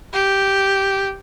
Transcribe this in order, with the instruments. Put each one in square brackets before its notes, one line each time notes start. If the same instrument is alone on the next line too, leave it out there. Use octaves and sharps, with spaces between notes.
[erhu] G4